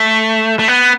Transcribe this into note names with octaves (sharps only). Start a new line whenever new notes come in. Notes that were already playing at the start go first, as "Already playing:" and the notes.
Already playing: A3
A3
B3